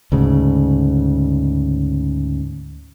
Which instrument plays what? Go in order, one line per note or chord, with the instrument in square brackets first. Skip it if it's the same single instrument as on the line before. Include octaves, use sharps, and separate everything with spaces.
[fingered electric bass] D2 G#2 C#3